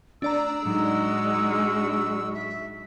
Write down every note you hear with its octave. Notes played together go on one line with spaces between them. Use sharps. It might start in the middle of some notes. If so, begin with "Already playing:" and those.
A3 D4 D5 A#5 E6
A2 F#3 G#3 D#4 F#4
E5